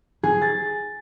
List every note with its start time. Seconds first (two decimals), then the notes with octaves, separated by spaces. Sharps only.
0.23 G#4
0.42 A6